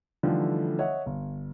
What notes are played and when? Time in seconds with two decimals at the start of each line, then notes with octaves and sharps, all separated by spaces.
0.23 D3 E3 F3 G3 A3 D#4
0.79 C#5 D#5 E5 F#5
1.06 G1